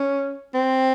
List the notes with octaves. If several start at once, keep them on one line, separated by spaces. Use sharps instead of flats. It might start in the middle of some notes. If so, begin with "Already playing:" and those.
Already playing: C#4
C4